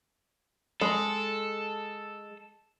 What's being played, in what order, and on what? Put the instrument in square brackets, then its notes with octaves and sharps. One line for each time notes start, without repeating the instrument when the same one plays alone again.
[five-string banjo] G#3 [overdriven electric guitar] A4